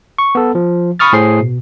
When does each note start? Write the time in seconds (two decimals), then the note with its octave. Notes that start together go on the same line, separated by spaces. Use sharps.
0.18 C#6
0.35 B3 A4
0.55 F3
0.99 B5 C#6 D#6 F6 A6
1.13 A2 G#4 C5 C7
1.40 B2